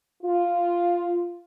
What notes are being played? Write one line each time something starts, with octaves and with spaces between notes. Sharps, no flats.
F4